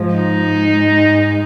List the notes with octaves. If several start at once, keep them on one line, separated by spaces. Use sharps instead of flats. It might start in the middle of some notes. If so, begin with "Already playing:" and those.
Already playing: G#2 F3 G#3
D#4
G#2 G#3